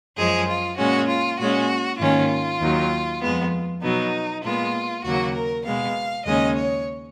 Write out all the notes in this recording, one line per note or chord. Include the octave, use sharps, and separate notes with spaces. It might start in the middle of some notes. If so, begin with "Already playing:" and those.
F#2 F3 G#3 G#4
F4
A#2 G#3 C#4 F#4
F4
A#2 G#3 C#4 F#4
G#2 D#3 A#3 C#4 F4
D#2 D#3 F#3
F2 F3 G#3 B3
B2 F#3 B3 D#4
A#2 G#3 B3 F4
D#2 C#3 F#3 A#3 F#4
A#4
B2 G#3 B3 F5
D#2 C#3 G#3 C#4 D#5
C#5